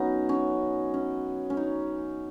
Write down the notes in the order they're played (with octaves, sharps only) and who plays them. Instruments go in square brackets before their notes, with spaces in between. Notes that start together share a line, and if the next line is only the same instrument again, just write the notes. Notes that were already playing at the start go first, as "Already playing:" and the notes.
Already playing: [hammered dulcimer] F#3 B3 C#4 D#4
C#4
C#4
C#4
D#4